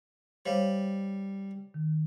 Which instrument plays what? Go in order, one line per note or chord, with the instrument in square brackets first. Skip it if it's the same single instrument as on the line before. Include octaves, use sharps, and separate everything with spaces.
[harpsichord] G3 [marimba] C5 C#5 F5
[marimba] D#3